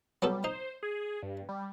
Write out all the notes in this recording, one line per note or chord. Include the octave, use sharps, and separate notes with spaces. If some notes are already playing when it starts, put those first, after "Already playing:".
F#3 G3 B3 A4
D#4 C5
G#4
G2
G3